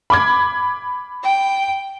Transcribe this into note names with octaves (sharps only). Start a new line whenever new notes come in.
B5 D6 G#6
G5